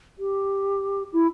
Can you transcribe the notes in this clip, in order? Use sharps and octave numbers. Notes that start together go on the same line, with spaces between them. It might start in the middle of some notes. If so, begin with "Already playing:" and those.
G4
E4